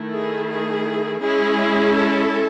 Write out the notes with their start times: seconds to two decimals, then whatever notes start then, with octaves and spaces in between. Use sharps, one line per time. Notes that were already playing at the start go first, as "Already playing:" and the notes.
Already playing: D#3 A3 E4
0.15 G#4
0.51 G#4
1.23 G#3 C#4 E4 G#4
1.96 A4